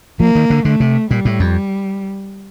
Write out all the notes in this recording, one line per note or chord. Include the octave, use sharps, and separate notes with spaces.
F3 A#3
D#3
D3
D3 A3
C3
A#2 G3
A2
F2